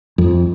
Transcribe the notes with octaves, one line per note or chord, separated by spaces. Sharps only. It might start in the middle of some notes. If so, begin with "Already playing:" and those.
F2